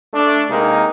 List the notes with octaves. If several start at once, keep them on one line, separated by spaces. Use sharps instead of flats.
A3 D4
C3 G#3 A#3 D#4 A#4